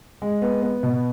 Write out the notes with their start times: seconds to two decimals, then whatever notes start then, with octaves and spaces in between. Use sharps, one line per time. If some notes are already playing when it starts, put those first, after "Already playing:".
0.22 G#3
0.42 B3
0.62 B3
0.83 B2